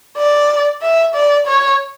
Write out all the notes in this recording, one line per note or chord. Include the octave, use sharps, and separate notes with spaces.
D5
E5
D5
C#5